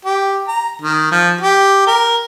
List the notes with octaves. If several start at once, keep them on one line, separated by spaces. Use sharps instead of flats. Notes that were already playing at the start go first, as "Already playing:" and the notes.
G4
A#5
D#3
F3
G4
A#4